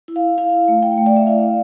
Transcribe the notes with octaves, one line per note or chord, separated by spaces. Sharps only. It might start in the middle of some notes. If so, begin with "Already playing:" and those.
E4
F5
E4 F5
A3
G5
A3
D5
E5
E4 F5